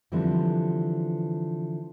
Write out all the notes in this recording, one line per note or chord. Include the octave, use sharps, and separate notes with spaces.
D3 E3 F3 G3 B3 C4